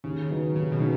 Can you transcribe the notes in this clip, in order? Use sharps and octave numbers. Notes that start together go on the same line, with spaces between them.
D#2 C#3
D#3 F#3 B3 D#4
D#2 C#3
B2
D#3 F#3 B3 D#4